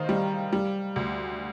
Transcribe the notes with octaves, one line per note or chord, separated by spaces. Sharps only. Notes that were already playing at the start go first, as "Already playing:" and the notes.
Already playing: D#3 C5 D#5 F5
G3
G3
D2